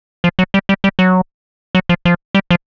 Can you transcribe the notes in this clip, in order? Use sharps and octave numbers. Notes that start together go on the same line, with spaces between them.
F3
F#3
G3
G3
G3
F#3
F#3
F3
F3
G3
F3